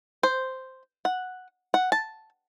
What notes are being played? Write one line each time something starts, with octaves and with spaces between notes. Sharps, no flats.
C5
F#5
F#5
A5